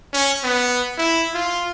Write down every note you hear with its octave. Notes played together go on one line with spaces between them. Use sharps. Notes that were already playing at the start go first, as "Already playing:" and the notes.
C#4
B3
E4
F4